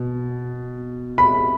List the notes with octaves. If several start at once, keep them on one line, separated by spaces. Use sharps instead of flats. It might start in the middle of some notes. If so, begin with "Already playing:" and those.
Already playing: B2
B5